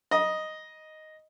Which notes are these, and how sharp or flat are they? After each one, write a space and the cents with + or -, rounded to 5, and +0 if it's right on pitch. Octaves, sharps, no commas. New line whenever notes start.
D#5 +0 A#5 +45